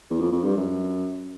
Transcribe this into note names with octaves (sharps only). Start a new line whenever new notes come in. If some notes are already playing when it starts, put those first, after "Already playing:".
E2
F2
F2
G2
F#2